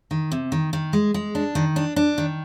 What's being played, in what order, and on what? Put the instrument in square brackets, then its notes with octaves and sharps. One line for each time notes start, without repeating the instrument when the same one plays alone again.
[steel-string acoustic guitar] D#3
C3
D#3
D#3
G#3
G#3
D4
D#3
D4
D4
D#3